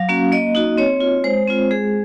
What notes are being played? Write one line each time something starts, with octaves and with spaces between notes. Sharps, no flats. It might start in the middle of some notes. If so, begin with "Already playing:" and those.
Already playing: F#3 F5
A#3 C#4 F#4
A#3 D#5
D#4 F#4
C4 C#5
F4
G#3 C5
C4 F4
G#3 G#4